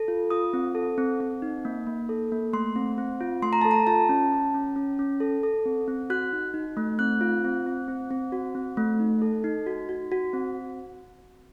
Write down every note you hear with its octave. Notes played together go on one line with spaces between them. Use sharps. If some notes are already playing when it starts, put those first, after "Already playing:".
Already playing: A4
F4
F4 D#6
C4
A4
C4
C4
D#4
A#3
A#3
A4
A#3
A3 C6
C4
C4
F4
A3 C6
A#5
A4 A5
A#5
F4 A5
C#4
C#4
C#4
C#4
C#4
A4
A4
C4
C4
F#4 F#6
D#4
D#4
A3
C4 F#6
F4
C4
C4
C4
C4
F#4
C4
A3
D#4
A4
D#4
F#4
F#4
F#4
C4